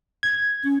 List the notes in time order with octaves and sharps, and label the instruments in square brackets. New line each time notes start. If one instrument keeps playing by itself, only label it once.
[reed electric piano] G#6
[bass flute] C#4